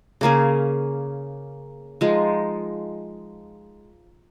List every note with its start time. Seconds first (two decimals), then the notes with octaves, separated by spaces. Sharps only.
0.21 C#3 A#3 C#4 G#4
2.01 F3 G#3 D#4